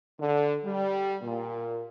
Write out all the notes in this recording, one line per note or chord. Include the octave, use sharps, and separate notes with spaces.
D3
G3
A#2